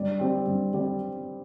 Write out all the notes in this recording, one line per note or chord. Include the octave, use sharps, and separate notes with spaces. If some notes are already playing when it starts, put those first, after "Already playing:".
Already playing: G2 D5
G3 C4
G2
G3 C4